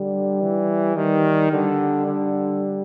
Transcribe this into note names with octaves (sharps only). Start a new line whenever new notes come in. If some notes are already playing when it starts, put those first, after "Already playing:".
Already playing: D3 G3
E3
D#3 G3
D3 G3
D3